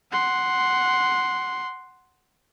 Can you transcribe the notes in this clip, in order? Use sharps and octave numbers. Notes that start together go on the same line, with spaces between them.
F#5 C6